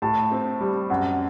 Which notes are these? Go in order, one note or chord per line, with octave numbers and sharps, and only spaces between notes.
A2 A5
C4
G3
F#2 F#5